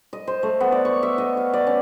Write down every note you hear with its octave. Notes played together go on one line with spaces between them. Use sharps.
D#5
C5
A3
B3
D5
C#6
E5
D#5
F5
D5
C#4